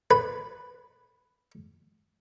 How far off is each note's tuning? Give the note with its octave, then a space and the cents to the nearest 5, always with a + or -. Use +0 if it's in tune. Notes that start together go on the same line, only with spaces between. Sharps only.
B4 +0